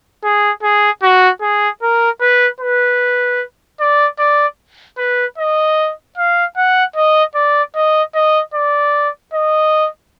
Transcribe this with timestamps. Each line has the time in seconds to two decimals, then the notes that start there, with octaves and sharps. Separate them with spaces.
0.24 G#4
0.63 G#4
1.03 F#4
1.42 G#4
1.82 A#4
2.21 B4
2.60 B4
3.80 D5
4.19 D5
4.98 B4
5.38 D#5
6.17 F5
6.57 F#5
6.96 D#5
7.35 D5
7.75 D#5
8.15 D#5
8.54 D5
9.34 D#5